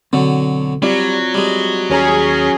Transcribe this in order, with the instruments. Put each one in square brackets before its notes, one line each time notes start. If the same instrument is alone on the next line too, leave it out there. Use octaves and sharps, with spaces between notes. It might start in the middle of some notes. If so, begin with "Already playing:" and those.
[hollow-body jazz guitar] B1 C4 [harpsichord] D3 F#3
[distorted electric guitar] F#3 [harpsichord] G3 [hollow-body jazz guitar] C4 F4 D5
[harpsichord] G3 G#3
[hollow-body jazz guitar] D#2 B4 A#5 [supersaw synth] C#4 G#4